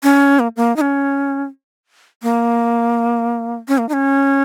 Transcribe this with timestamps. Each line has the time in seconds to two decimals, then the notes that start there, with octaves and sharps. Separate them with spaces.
0.03 C#4
0.39 A#3
0.57 A#3
0.76 D#4
0.81 C#4
2.23 A#3
3.68 C#4
3.78 A#3
3.89 D#4
3.93 C#4